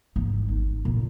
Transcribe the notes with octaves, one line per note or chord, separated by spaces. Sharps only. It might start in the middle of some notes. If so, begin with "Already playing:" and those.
G#1
D#4
A#2